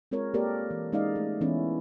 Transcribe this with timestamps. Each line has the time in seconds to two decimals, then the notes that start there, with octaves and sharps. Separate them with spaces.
0.11 G#3 C4 F4 A#4 C#5
0.34 A#3 G4 A4 A#4 C5 D5
0.71 E3
0.92 G#3 C#4 D#4 D5 D#5 F5
1.16 A3
1.41 E3 B3 C#4 E4